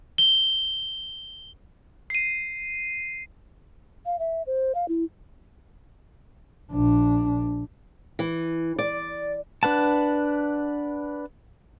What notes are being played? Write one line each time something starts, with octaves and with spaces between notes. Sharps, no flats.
G7
C7 D#7
F5
E5
C5
F5
E4
A#1 D4
E3
D5
D4 B4 F#5 A5